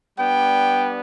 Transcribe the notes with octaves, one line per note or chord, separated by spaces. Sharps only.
G3 B3 D4 G5